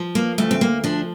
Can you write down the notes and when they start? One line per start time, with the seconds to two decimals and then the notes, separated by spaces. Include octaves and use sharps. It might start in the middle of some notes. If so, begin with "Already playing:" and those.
Already playing: F3
0.15 A#3
0.38 D2 A3
0.51 C4
0.61 A#3
0.84 F3 D4